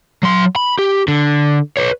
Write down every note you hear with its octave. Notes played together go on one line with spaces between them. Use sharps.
F#3 C6
B5
G4
D3
B4 C#5